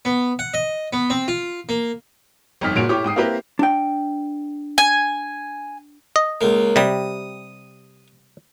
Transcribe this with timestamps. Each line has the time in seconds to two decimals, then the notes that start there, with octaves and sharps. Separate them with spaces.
0.05 B3
0.39 F#5
0.54 D#5
0.93 B3
1.10 C4
1.28 F4
1.69 A#3
2.61 G1 F2 D#4 F6 B6
2.75 F#1 A#2 F#4 C#5 D7 F7
2.89 A2 G4 C#5 C#6 D6
3.04 G#2 G5 D#6 C7
3.16 A#3 C4 E4 G4 A#4 B4
3.59 D4 G5
4.78 G#5
6.16 D#5
6.41 C#2 A#3
6.76 C3 G3 D#6